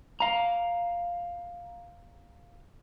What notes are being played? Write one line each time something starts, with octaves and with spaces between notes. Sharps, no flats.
F5 A#5